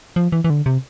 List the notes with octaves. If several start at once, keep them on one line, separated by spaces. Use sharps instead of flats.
F3
E3
E3
D3
C3